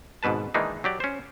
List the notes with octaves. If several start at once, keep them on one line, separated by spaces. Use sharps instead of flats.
G#1 G#2 B2 B4 A5
D#3 E3 G#3 A#3 D4 D#4
F#3 G4 D5
C#4 C5